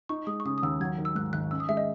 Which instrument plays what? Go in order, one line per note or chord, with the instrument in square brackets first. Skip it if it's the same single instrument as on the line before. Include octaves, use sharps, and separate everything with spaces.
[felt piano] D#4 [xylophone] C#6
[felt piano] G#3 [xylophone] D#6
[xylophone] C#6
[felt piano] C#3 [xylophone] D#6
[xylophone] D#6
[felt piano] D#2 [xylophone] E6
[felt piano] F#3 [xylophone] G#6
[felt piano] D#3
[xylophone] E6
[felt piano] G#2 [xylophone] F#6
[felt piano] G#1 [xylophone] F#6
[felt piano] C#4 [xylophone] E6
[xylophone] D#6
[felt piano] G#3 [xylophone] E5
[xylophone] D#5